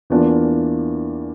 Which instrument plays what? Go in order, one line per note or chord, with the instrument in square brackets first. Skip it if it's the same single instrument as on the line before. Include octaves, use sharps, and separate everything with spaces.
[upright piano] E2 E3 A#3 D4 F4